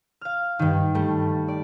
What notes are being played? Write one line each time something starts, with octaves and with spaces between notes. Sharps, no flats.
F5 F6
G2 D#3
G3 A3
D5